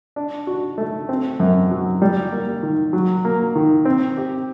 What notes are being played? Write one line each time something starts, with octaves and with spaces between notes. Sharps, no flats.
D4
F#4
A3
C4
F#2
F#3
G3
A#3
D#3
F#3
A#3
D#3
C4
G4